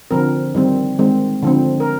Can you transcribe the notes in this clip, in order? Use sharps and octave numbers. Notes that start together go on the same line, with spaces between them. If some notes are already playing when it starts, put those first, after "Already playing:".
D3 F3 C4 A#4
D#3 G3 C4
D#3 G#3 C4
D3 F3 C4
A#4